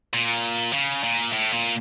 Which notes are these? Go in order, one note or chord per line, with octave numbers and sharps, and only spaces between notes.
A#2
C#3
A#2
A2
A#2